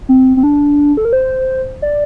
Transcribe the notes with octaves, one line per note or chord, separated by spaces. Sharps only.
C4
C4
D4
A4
A#4
C5
D5